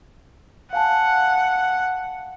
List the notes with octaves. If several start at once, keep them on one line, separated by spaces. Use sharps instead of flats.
F5 F#5 G#5 A5